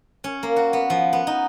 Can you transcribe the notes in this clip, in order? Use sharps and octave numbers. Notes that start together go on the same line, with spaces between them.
C#4
A#3
F#4
B3
F3
B3
D#4